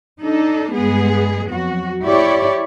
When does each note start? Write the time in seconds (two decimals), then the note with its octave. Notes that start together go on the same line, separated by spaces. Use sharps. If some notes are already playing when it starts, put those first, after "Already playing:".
0.21 D4 D#4 A4
0.73 G2 G#3 B3 G#4
1.49 F2 F#3 F#4
2.03 E4 G4 C#5 D5